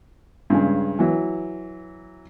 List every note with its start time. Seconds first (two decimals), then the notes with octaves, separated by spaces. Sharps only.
0.50 G2 C#3 G#3
0.99 E3 F#3